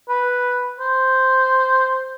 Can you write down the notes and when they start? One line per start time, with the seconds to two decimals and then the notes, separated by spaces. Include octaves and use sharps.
0.09 B4
0.80 C5